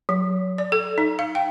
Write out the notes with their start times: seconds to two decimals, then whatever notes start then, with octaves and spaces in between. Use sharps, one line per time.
0.09 F#3
0.58 D5
0.72 A4
0.98 D#4
1.19 F5
1.35 G5